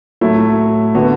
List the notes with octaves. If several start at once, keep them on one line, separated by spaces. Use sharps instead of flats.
A2 F#3 A3 E4
D3 B3 F#4